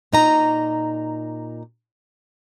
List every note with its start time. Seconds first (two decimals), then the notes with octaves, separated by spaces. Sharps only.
0.13 A#2 D#4 A#5